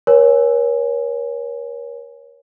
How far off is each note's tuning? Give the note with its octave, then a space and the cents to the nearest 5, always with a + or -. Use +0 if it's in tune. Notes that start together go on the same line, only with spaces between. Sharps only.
A#4 +40 C#5 +0 G#5 +0